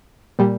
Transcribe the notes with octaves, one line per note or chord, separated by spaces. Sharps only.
A#2 G3